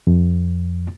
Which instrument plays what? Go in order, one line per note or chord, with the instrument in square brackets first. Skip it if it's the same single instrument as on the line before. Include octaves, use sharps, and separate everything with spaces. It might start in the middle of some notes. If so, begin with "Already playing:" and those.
[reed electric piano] F2